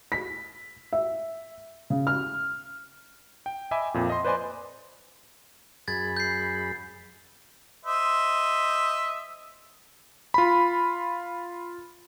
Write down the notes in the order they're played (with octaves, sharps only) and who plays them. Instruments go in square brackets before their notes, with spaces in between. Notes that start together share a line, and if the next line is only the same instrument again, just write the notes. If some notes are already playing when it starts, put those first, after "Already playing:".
[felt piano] B6
E5
C#3
F6
[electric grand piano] G5
D#5 E5 G5 G#5 B5 D6
F2 A#2
D#5 C6
B4 C5 D5 D#5 G#5 C6
[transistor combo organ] F#2 G#4 B5 [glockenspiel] G#6 A6
[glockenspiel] G6 C7
[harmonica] C5 D#5 E5
[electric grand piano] F4 B5